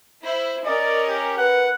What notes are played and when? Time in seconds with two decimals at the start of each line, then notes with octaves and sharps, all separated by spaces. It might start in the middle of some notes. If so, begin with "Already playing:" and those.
0.23 E4 C5
0.66 C#4 A#4 D5 D#5
1.08 G4
1.38 B4 F#5